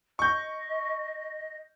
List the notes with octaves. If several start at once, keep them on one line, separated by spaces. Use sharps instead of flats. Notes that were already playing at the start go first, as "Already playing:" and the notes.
D#5 C#6 G6